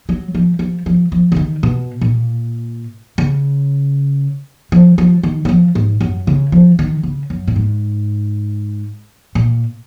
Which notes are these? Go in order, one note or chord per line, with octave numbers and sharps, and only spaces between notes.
F#3
F3
F3
F3
F3
C#3
D#3
B2
A#2
C#3
F3
F3
D#3
F#3
F3
G#2
F#2
C#3
F3
D#3
C#3
F#2
A#2
G#2
A#2